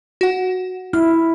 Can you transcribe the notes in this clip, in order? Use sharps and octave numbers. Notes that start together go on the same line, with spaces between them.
F#4 F#5
E4 F6